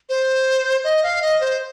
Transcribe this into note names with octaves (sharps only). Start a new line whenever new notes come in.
C5
D#5
F5
D#5
C5